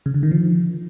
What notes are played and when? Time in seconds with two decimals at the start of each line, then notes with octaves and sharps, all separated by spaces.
0.06 C#3
0.14 D3
0.23 D#3
0.31 F3